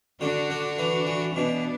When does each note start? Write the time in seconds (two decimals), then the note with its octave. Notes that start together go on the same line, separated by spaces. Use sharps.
0.21 D3 D4 F#4
0.50 D3
0.79 E3
1.07 E3
1.36 B2 B3 D4